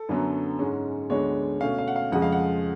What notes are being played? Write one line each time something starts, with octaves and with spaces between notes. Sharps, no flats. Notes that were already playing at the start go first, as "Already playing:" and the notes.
Already playing: A4
F#2 D3 F#3 B3
G#2 G#3 C#4
D2 D3 G#3 B3 D4 C#5
B2 A3 C#4 F5
F5
F#5
F5
F2 C#3 F3 G#3 F#5
F5
F#5